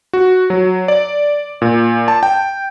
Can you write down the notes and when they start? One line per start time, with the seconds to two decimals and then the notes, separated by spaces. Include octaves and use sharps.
0.13 F#4
0.50 F#3
0.88 D5
1.62 A#2
2.08 A5
2.23 G5